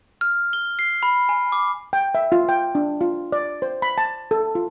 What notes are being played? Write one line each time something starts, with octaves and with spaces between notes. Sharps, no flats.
F6
G7
C7
B5
G#5
D6
G5
E5
F4
G5
D4
F4
D5
C5
B5
A5
A4
F4